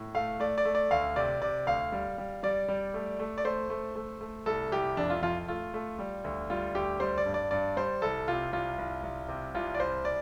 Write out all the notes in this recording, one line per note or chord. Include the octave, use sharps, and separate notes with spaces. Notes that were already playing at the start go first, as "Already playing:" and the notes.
Already playing: A2
A3 F5
A3 D5
D5
A3
D5
D2 F5
C3 D5
C3 D5
D2 F5
G3
G3
G3 D5
G3
A3
A3
D5
A3 C5
A3
A3
A3
C2 A4
C2 G4
F2 D4
F4
F2 F4
A3 F4
A3
G3
D2
G3 F4
D2 G4
G3 C5
D5
G2
D5
G2 D5
G3 C5
C2 A4
C3 F4
C2 F4
C2
C2
C3
C2 F4
D5
C2 C5
D5